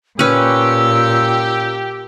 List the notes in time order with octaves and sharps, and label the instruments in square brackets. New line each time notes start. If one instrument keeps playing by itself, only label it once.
[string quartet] A#2 [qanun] C#4 B4 [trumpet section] G4 [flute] E6